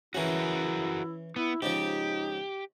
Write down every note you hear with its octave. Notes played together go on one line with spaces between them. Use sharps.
E3 C#4 E4 F#4 G#4 A#4
B3 E4
G#2 C#3 F3 D#4 G4